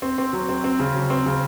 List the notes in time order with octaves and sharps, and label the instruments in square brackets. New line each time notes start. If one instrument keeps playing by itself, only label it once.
[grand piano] C4
C4
F#3
C4
C4
C#3
F#3
C4
C#3